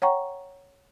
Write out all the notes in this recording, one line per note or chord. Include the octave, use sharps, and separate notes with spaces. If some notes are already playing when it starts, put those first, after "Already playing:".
C#5 F#5 G5 A#5 C#6